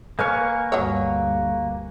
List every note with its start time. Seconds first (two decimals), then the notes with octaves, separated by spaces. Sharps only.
0.19 A#3 B4 G#5 C#6 F6
0.72 D2 G2 F#3 C#5